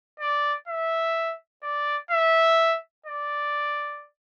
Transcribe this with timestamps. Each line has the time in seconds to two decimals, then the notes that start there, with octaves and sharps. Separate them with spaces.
0.20 D5
0.68 E5
1.63 D5
2.11 E5
3.06 D5